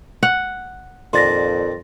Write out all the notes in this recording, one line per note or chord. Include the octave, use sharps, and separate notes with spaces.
F#5
F2 A#2 D#3 D4 C6 A6 A#6